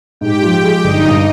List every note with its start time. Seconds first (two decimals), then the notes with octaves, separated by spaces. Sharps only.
0.21 G#2 G4 G5
0.42 F3
0.63 G#3
0.84 G1 D#4 D#5
1.06 G2